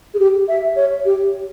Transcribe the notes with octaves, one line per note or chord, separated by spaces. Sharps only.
G#4
G4
E5
C#5
G4